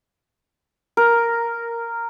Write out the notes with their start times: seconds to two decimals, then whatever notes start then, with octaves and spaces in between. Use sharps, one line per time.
0.97 A#4